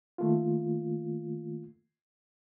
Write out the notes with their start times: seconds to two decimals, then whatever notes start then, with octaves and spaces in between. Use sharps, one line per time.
0.18 D#3 A3 A#3 F4